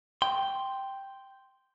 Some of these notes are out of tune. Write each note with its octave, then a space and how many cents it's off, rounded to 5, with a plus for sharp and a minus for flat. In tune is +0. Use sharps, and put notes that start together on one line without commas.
G5 +0 C6 +0